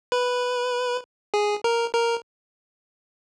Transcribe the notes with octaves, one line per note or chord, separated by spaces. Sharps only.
B4
G#4
A#4
A#4